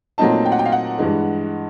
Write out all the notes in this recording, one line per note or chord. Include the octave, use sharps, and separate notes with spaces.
A#2 F#3 A3 C4 D#4 A5
G5
F#5
G5
F5
F#5
G2 E3 G#3